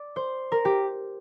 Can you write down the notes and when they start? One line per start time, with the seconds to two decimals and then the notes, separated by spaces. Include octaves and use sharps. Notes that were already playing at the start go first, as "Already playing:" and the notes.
Already playing: D5
0.16 C5
0.52 A#4
0.65 G4